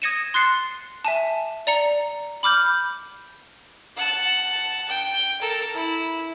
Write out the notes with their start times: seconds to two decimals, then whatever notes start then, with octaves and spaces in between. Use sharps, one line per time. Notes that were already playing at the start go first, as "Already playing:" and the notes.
0.02 D#6 G#6 A#6 C#7 D#7 E7
0.34 C6 F#6 A6 C7 C#7
1.05 E5 G#5 A5
1.67 D5 A#5 C#7
2.43 B5 D6 F6 G6
3.96 F#5 A5
4.88 G5
5.41 A4 A#4
5.74 E4